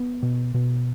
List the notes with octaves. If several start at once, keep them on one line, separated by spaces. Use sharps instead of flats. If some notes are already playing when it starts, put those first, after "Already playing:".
Already playing: B3
B2
B2